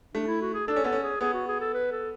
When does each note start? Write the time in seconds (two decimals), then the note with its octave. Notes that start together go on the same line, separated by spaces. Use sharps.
0.14 A3 D4
0.27 E4
0.41 F#4
0.54 G#4
0.68 D4 A4
0.76 C#4
0.84 B3 A4
0.93 C#4
1.03 G#4
1.21 B3 G#4
1.33 F#4
1.48 G#4
1.61 A4
1.74 B4
1.92 A4